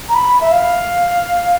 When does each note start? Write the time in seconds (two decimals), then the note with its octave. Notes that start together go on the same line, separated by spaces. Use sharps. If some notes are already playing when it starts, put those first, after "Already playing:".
0.09 A#5
0.14 B5
0.41 E5
0.52 F5